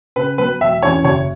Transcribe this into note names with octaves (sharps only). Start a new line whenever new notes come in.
C#3 B4
F#3 B3 B4
E1 E5
E2 E3 C#4 C#5
F#1 C#5